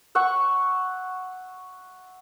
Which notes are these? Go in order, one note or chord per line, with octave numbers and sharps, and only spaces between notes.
E5 F#5 C#6